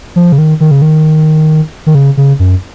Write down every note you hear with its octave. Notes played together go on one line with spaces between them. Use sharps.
F3
C#3
D#3
D#3
C#3
D#3
D#3
C#3
C#3
F#2